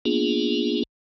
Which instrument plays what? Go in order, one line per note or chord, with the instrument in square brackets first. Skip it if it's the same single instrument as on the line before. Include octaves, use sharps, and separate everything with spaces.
[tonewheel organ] A#3 B3 D4 F4 G#4